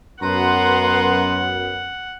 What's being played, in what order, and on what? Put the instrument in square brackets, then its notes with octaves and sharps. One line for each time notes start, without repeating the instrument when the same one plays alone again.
[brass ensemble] F#2 [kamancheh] B3 [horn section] B4 A#5 C6 [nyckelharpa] F#5